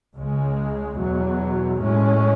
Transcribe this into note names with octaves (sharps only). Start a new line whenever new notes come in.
C#2 C#3 G#3
E2 B2 F#3
A2 G#3 C#4